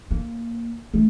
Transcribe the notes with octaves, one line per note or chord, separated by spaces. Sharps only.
A#3
A3